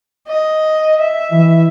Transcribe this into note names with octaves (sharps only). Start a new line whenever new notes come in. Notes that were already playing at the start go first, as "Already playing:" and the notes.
D#5
E5
E3